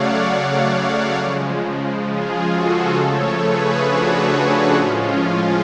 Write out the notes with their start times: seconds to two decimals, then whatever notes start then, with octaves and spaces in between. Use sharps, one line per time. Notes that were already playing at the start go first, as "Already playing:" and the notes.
Already playing: C#3 F#3 A3 C#5 D5 F5 F#5
0.27 D5 F#5
0.71 C#5 F5
1.17 C#3 F3 G#3
2.06 F4 G#4
2.52 F#4 A4
2.96 C#3 F3 A3 A4 C#5
3.41 G#4 B4
3.86 D4 F#4
4.31 D4 F#4
4.75 A2 F3 G#3 C#4 F4